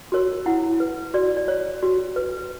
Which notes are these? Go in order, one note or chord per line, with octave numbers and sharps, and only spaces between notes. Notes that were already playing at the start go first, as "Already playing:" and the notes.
F#4 A#4 C#5
E4 F#5
B4
F#4 D5
D5
C#5
F#4
B4